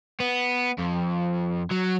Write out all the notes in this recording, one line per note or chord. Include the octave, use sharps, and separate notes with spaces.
B3
F2
F#3